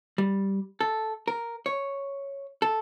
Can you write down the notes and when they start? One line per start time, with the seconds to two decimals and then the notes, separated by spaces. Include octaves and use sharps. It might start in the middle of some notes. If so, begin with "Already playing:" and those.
0.18 G3
0.81 A4
1.28 A#4
1.66 C#5
2.62 A4